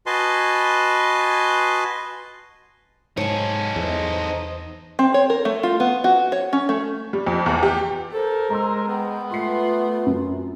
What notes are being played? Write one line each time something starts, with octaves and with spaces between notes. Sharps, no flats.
F#4 B4 D#5 G#5 A5 C6
G#2 D#4 A4 C#5 G#5
E2 C5 D#5
C4
C#5
A#4
A3
F4
B3
F#4
C#5
C#4
A3
G3
F2
E2
G4
A4 A#4 C5
G#3 A#5 C6 E6
B3 G5
A3 F4 C6 C7
F#2